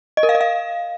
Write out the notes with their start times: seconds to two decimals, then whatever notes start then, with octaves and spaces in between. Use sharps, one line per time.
0.17 D#5
0.23 A#4
0.29 F5
0.35 D#5
0.41 F5